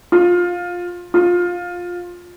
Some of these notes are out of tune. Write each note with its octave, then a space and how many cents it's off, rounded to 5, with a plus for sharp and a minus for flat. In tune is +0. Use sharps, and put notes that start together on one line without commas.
F4 +15
F4 +15